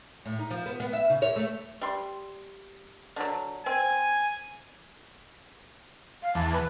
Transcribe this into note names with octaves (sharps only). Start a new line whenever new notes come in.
A2
D#4
F3
B3
B3
E5
C#3
C#5
A3
G3 C6
D3 F#3
C4 G#5
F5
E2 A5
B4